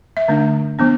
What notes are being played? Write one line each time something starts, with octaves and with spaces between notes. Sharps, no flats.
E5
D3 A3 D4
F3 B3 D4